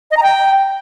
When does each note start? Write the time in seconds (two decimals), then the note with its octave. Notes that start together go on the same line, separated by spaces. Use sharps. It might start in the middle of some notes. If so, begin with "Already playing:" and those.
0.11 D#5
0.17 A#5
0.23 G5